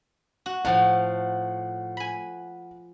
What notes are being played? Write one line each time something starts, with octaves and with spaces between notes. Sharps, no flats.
F#4
A2 F3 C#5 F#5
G#5 B5